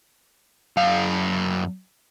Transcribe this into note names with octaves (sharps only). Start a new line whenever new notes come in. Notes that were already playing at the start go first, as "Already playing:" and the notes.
F#2 F5